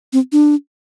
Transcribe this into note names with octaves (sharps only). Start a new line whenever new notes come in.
C4
D4